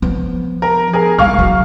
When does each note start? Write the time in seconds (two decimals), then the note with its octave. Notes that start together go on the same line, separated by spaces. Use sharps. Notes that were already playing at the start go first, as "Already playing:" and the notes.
0.02 F3 B3
0.62 A#4
0.93 G#4 A#4
1.19 D#3 G3 F5 C#6 F6
1.39 D3 F#3